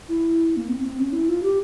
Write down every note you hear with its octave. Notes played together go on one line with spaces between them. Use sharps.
E4
A#3
C4
C4
C#4
E4
F4
G4